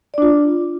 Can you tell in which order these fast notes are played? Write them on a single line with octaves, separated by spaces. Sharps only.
D5 D4 F4